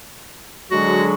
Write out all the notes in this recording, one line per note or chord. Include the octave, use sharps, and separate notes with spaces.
D3 F#3 G#3 F#4